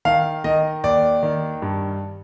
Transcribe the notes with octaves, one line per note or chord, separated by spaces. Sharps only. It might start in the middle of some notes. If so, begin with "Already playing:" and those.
D#3 F5
D#3 D#5
D#2 D5
D#3
G2